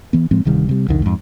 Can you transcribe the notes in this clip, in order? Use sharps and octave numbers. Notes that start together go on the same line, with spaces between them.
E3 B3
A2 F3 G#3 C4
D1 C3 D#3 G3
C3 G3
C2 F2 D3 D#3
F2 G#2